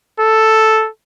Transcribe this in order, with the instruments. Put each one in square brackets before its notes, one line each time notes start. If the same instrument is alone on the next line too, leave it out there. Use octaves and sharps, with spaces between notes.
[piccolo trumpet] A4